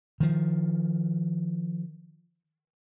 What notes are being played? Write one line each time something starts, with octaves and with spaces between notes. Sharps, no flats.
D#3 F3